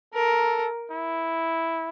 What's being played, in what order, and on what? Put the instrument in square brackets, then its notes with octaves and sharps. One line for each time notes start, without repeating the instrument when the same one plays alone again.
[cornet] A4 [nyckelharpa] A#4
[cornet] E4